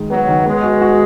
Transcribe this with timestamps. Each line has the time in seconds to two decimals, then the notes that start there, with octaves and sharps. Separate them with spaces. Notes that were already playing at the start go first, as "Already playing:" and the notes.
Already playing: D#3 G#3
0.10 F#3 B3
0.28 D#3
0.46 G#3 B3
0.63 F#4
0.81 F#4